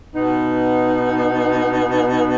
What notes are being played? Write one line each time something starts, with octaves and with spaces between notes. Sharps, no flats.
B2 B3 D#4